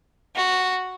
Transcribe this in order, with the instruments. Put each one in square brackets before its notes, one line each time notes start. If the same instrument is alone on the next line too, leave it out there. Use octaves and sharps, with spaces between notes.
[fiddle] F#4